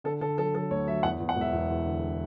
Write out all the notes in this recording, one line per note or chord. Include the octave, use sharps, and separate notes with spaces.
D3 A4
D3 A4
F#3 A4
F#3 A4
D2 C#5
F#3 E5
E2 F#5
E2
F#5
E1
E5
E2
E2
D3